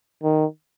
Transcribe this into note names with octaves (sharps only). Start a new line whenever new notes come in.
D#3